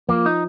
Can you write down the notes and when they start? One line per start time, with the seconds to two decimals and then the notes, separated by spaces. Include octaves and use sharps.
0.09 F3 A#3
0.26 D#4